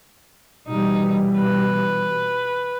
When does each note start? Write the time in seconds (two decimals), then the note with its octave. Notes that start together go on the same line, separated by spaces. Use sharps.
0.68 B2 E3 G3 D#4
1.38 B4